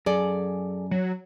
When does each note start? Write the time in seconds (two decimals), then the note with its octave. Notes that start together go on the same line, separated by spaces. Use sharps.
0.06 F#2 G#4 A4 D5
0.91 F#3